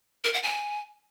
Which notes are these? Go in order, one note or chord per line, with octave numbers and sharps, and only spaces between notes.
A#4
F#5
G#5